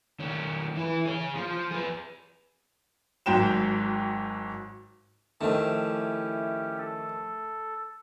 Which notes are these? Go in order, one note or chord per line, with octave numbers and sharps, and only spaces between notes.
D#3 C#4
E3 B4
G#4 C#5
F3 C5
G#4 B4
G#1 G#2 F#3 G5 E7
D#3 F3 A3 C#4 E4 G4
A4